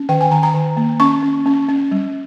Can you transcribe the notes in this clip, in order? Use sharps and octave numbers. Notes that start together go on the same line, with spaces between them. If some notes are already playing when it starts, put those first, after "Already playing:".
Already playing: C#4
D#3 G5
G#5
D#3 A#5
A#5
D#3
A#3
C#4 C#6
C#4
C#4
C#4
G3